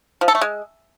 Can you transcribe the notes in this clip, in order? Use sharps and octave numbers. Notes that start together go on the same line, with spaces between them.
F3
A4
A3
G#3